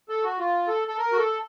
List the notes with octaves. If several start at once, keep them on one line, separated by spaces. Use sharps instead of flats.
A4
F#4
F4
A4
A4
A#4
F#4
A4